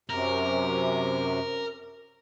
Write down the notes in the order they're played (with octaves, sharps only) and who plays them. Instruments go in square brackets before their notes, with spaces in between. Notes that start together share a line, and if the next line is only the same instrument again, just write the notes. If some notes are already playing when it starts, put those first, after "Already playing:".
[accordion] F#2 C3 [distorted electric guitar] A#4